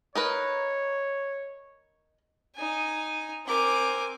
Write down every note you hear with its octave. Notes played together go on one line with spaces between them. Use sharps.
D#4 A#4 B4 C#5
D#4 G#5
C4 A#4 G#5 D6